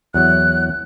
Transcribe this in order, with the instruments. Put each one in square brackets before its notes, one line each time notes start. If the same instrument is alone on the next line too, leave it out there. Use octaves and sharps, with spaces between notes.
[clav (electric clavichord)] E2 F#3 [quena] F#6